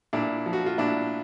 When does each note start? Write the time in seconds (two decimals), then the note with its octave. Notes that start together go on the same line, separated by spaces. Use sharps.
0.13 A#2 D4 E4
0.46 F3
0.53 F#4
0.66 F4
0.78 A#2 D4 E4